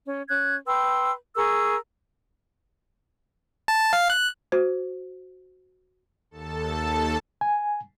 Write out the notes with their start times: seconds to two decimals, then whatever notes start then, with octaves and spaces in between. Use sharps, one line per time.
0.07 C#4
0.29 C#4 F#6 G#6
0.66 B4 G5 C6 E6
1.36 G#4 A#4 C#6 E6
3.68 A5
3.93 F5
4.10 F#6
4.52 F#4 C5
6.31 D#2 A4 A5
7.41 G#5